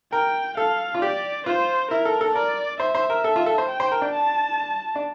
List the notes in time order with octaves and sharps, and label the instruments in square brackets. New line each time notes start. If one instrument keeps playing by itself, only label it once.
[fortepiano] A#4 [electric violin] G5
[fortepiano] A4 [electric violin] F5
[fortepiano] F4
[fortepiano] G4 [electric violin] D5
[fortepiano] F4 [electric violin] C5
[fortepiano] E4 [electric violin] A#4
[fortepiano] A4
A4
[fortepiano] A#4 [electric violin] D5
[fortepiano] C5 [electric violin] E5
[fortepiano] C5
A#4
A4
F4
A4
C5
[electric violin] G5
[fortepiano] C5
A#4
D4
[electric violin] A5
[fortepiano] D4